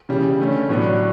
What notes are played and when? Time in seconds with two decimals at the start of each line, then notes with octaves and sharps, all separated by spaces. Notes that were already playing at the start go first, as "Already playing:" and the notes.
0.09 C#3 E3 G3
0.39 D3 A3 C#4
0.69 A2 F#3 B3 D4